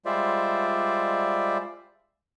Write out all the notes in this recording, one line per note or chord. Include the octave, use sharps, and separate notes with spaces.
G3 G#3 F4 C5 D5 E5